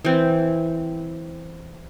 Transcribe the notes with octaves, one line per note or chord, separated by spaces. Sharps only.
E3 C4